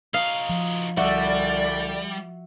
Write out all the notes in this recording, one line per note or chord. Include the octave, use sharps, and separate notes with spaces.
D#4 F#4 F5
F3
C2 D3 G3 F#4 D5 E5